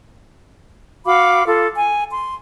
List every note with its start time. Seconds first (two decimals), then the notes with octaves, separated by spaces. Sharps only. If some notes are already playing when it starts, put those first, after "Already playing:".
1.06 F#4 F5 B5 D6
1.46 F4 A4
1.75 G#5
2.10 C6